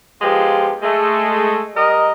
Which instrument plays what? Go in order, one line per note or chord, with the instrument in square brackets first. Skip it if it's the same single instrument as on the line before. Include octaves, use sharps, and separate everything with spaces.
[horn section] F3 G#3 B3 F4 G4
G#3 A3
G3 A#4 D#5